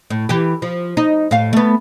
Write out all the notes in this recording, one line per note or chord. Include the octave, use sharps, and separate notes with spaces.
A2
E3 G4
F3
D#4
A2 F5
A3 B3